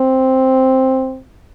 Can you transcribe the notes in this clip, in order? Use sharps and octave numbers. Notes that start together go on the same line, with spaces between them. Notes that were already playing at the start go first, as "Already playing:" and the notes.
Already playing: C4